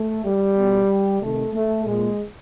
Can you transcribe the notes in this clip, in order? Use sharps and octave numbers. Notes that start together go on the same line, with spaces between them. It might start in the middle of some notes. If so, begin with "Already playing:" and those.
Already playing: A3
G3
B2
C3 D#3 A3
A3
A#2 G#3